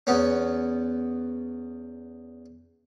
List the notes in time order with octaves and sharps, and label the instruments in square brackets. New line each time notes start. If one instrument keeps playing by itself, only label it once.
[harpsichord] E2 B3 C#4